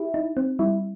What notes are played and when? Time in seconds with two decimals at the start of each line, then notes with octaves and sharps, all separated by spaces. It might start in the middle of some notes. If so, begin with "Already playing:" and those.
Already playing: E4 G4
0.14 D#4
0.37 C4
0.59 G3 E4